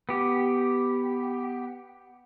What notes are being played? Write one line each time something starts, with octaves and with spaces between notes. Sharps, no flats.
B3 G4